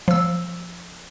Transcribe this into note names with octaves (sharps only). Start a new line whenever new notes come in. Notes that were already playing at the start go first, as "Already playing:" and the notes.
F3 E6